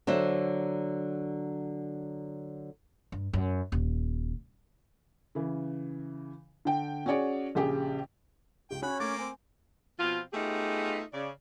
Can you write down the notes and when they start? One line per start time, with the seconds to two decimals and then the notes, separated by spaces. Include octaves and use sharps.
0.07 D3 F#3 C5 E5
3.12 G2
3.33 F#2
3.72 D#1
5.35 C#3 E3
6.65 D3 G5
7.06 C#4 F#4 G#4 C#5 D5
7.55 A#1 C#3 G4 G#4 G5
8.70 C#2 G4 G5
8.82 C#4 F#4 C#5 G#5 B5 F#6
9.00 A3 A#3 D6 A6
9.19 C4 G#5
9.99 B2 F3 C4 F4
10.33 A3 B3 D#4 F4 G4 G#4
11.13 C#3 D5